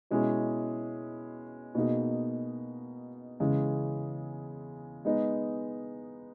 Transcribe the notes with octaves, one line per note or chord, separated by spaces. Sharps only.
B2 G#3 C#4 E4 G#4
B2 A#3 D#4 G#4
C#3 E3 G#3
G#3 B3 D#4